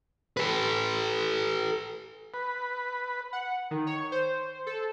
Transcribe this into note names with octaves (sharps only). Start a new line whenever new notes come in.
A4 B4
B4
F#5
D#3
C#5
C5
A4